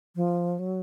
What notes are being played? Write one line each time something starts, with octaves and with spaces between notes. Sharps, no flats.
F3
F#3